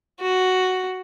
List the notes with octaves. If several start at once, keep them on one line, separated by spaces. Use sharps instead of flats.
F#4